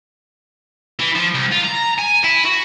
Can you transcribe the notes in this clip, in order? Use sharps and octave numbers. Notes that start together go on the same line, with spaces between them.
E3
F3
C2
F4
A#5
G#5
E4
F#4